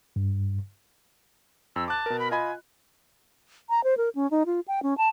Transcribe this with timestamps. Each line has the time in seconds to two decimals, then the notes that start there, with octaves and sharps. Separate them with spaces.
0.16 G2
1.76 F2 E6
1.88 A5 D6 F#6
2.06 B2 A#4
2.19 B5
2.31 F4 D#5 G#5 B5
3.69 A#5
3.84 C5
3.97 A#4
4.15 C#4
4.31 D#4
4.46 F4
4.68 G5
4.83 C#4
4.98 A5